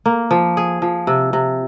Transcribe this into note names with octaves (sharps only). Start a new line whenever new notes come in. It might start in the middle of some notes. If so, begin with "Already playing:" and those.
A#3
F3
G#4
F3
C3
C3